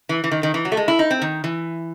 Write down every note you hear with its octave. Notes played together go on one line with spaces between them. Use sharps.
E3
E3
D#3
D#3
E3
F#3
A3
G#3
E4
D#4
C4
D#3
E3